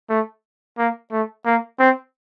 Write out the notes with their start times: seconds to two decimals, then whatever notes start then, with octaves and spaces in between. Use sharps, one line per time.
0.10 A3
0.78 A#3
1.12 A3
1.46 A#3
1.79 C4